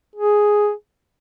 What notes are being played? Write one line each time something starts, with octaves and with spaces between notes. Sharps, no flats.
G#4